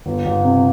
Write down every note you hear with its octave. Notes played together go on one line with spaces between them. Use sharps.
G1
G1
C3